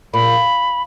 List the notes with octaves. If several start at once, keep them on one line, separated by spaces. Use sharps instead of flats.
A#2 B5